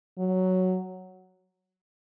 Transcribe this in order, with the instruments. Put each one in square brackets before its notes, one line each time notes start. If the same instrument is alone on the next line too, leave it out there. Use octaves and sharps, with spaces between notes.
[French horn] F#3